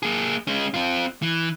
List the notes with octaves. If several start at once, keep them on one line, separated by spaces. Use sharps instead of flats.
A#3 G#4
G#3 C#4
C4 F4
E3